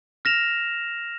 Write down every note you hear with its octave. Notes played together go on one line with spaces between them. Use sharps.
F6 A#6 E7 F7